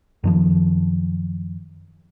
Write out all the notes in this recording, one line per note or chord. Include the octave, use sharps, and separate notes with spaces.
F#2 D#3 F3